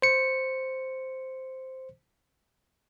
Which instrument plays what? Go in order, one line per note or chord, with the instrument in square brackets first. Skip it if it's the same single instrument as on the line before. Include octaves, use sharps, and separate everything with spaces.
[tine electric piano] C5 C#7